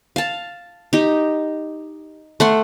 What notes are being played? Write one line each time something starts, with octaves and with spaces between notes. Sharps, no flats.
F5 A5
D#4 G4
A3 F#5 C6